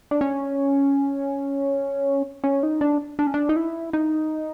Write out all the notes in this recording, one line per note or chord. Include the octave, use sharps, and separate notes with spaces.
D4
C#4
C#4
D#4
D4
D4
C#4
D4
D#4
E4
D#4